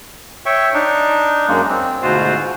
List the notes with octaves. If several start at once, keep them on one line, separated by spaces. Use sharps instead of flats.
C#5 E5 G5 C#6
D4 D#4
F#2 G#3 A#3
C4
D2 G#2 B2 F4 F#4 C5